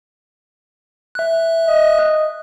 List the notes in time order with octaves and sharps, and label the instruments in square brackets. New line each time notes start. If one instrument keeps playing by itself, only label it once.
[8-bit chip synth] E5 F#6
[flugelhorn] D#5